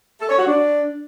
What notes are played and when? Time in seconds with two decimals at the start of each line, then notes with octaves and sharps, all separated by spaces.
0.20 A4
0.29 C#5
0.38 F#4
0.47 D4